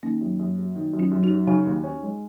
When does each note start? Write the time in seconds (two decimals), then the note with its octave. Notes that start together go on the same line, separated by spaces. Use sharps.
0.03 D#3 A#3 C#4
0.21 F#2
0.39 F#2
0.58 F#3
0.76 D#3
0.93 F#2
0.99 C#4 F4
1.11 F#2
1.23 D#4 F#4
1.30 F#3
1.47 C#3 D#4 F#4
1.66 D#2
1.84 C#4
2.03 G#3